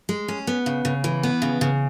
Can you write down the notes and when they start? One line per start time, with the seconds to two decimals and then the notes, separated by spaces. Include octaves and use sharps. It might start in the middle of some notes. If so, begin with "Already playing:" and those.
0.09 G#3
0.28 C#4
0.47 B3
0.66 C#3
0.85 C#3
1.04 E3
1.23 B3
1.42 C#3
1.61 C#3